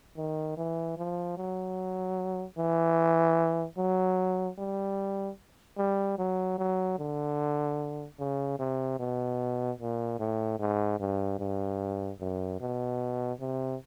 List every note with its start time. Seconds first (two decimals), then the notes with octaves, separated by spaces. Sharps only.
0.17 D#3
0.57 E3
0.97 F3
1.37 F#3
2.58 E3
3.77 F#3
4.58 G3
5.78 G3
6.18 F#3
6.58 F#3
6.99 D3
8.19 C#3
8.59 C3
8.99 B2
9.79 A#2
10.20 A2
10.59 G#2
10.99 G2
11.39 G2
12.20 F#2
12.60 B2
13.40 C3